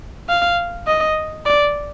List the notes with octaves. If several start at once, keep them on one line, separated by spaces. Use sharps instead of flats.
F5
D#5
D5